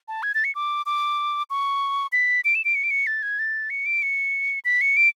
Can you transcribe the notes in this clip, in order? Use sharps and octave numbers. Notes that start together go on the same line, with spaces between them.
A5
G#6
A6
C#7
D6
D6
C#6
B6
D7
E7
D7
C#7
D7
C#7
A6
G#6
A6
C#7
D7
C#7
B6
C#7
D7